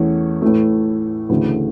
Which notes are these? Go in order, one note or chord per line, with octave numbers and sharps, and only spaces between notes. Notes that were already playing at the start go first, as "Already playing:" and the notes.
Already playing: E2 E3 A3 C#4
A2 E3 A3
D2 C#3 E3 A3